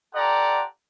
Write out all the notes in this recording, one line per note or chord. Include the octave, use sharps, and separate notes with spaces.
F4 G4 A4 D5 F#5 A#5